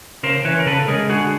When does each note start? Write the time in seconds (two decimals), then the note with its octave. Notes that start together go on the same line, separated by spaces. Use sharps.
0.23 C#3 A#4 C5
0.44 E3 B4 C#5
0.59 A#4
0.66 C#3 A4 B4
0.88 G#3 G#4 A#4
1.09 D3 F#4 G#4